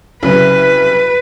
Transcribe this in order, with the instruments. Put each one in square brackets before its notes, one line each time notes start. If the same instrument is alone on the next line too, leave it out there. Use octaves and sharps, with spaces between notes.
[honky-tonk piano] C2 C#3 F#3 [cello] B4